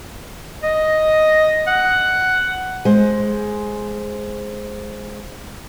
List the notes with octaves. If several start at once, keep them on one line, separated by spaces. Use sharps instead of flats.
D#5
F#5
G#3 C5